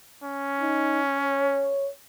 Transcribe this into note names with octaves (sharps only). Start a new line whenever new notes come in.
C#4
D#4
C#5